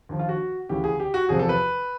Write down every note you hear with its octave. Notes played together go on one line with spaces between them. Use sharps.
D#2 D3 F3
F4
F#4
D2 C#3 E3 G4
G#4
G4
F#4
E2 C3 F3 G#4
A4
B4